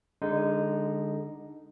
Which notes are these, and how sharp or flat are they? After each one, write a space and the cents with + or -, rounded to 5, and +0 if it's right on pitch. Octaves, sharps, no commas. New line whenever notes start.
D3 +5 G#3 -25 D#4 +0